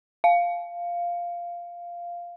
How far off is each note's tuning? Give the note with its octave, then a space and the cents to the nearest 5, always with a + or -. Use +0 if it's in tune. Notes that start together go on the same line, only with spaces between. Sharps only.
F5 -5